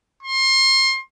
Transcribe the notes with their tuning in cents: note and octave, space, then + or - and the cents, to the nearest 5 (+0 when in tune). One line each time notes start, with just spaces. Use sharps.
C6 +30